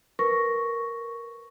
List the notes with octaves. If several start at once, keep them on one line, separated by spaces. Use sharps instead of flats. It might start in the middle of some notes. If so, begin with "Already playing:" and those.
A#4 B4 C#6 A#6